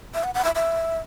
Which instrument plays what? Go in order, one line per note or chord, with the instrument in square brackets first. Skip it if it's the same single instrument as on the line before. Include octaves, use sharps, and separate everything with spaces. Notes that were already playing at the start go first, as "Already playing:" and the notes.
[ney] E5
F#5
F#5
E5
E5